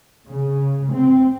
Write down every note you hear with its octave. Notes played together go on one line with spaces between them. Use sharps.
C#3
C4